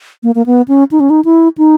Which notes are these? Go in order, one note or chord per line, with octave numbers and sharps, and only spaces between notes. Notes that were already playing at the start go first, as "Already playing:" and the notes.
A#3
A#3
B3
C#4
D#4
C#4
D#4
E4
D#4